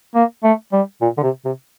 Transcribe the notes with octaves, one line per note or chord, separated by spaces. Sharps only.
A#3
A3
G3
A#2
D3
C3
C3